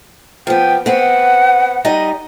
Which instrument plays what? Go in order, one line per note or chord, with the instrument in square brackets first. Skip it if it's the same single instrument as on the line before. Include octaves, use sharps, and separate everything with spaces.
[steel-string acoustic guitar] F3 B3 [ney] G5
[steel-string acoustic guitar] B3 C4 [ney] F#5
[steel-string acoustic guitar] G3 D#4 D#5